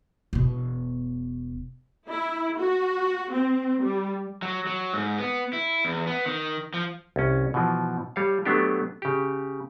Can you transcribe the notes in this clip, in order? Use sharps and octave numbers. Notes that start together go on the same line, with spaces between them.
E1 B2
E4
F#4
C4
G3
F#3
F#3
G#2
B3
E4
E2
B3
D#3
F3
C2 C#4
B2 E3 F3
G3 C#5 F5
F#3 A3 B3 D4 G4
C#3 G4